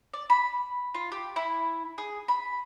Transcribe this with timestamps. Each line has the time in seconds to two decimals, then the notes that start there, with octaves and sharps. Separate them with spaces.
0.13 D5
0.30 B5
0.95 F4
1.12 G4
1.36 E4
1.98 G#4
2.28 B5